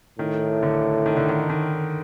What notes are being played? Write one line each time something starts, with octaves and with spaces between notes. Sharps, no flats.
A2 D#3
D3
D#3
D3
D#3
D#3